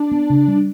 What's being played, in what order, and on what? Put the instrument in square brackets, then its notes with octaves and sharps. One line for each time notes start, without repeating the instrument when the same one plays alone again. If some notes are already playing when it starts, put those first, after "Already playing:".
Already playing: [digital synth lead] D4
[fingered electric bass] B3
C#3
G3